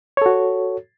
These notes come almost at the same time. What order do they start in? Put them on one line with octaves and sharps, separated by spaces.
C#5 A4 F#4